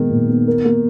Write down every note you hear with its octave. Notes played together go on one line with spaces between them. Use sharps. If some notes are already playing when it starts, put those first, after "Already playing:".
Already playing: A#2 D#3 G#3 B3 D#4
A#2
B3
A#4
A#3